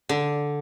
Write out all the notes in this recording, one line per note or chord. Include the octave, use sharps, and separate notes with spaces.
D3